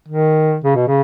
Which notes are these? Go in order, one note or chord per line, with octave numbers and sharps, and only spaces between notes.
D#3
C#3
B2
C#3